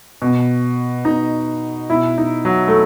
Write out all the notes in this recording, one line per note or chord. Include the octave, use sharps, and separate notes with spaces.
B2
B2 D#4
B2 E4
D#4
F#3
A3